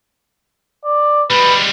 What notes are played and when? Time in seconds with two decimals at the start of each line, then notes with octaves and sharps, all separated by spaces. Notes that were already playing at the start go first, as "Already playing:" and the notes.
0.85 D5
1.30 G3 G#3 B4